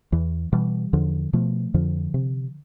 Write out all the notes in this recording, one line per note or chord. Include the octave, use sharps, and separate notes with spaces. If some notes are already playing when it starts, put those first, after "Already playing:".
E2 E3
B2 E3 G3
E2 D3 F3
B2 F3 A3
F2 D3 F3
C3